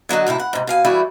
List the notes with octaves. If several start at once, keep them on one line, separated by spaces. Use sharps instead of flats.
D3 F#3 F#4 D#5
F#2 A2 C3 E4
F#5
G#2 C3
B2 F5 G#5
E3 G3 A3 E4 F#4 G#4